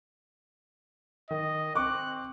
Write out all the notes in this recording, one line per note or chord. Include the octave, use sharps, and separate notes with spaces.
D#3 D#5
C4 C#6 D6 F#6